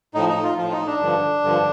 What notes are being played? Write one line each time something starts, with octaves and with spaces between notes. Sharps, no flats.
A2 F3 D#4
D#4
F4
A2 F3 F4
D#4
D4
G2 D3 F3
G2 D3 F3